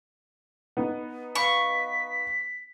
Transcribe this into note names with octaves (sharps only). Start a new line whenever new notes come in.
B3 D#4
B4 F5 B5 C#6 B6